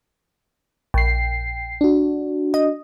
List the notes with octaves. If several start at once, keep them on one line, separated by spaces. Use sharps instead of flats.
A#1 G5 C7
D4 F#4
D#5